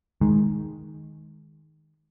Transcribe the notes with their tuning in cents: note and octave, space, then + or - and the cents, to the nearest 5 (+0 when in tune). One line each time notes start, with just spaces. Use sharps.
D#3 +0 G#3 +0